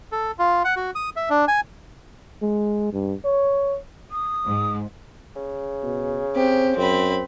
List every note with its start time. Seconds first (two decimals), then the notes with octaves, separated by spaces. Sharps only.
0.12 A4
0.39 F4
0.64 F#5
0.76 F#4
0.95 D#6
1.16 E5
1.30 D4
1.48 G#5
2.42 G#3
2.93 G2
3.25 C#5
4.11 D#6
4.44 G#2
5.36 C#3
5.83 B2
6.36 C4 G4 C5
6.77 F#2 C4 B5